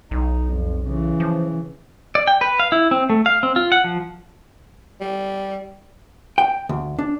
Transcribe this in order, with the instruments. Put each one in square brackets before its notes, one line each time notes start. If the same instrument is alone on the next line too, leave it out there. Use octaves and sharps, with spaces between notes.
[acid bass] B1 [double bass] D#4
[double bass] F2
C#3 E3
[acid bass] F3
[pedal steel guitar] D5
G5
B4
F5
E4
C4
A3
F5
C4
F4
F#5
F3
[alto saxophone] G3
[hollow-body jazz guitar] G5
D2
D4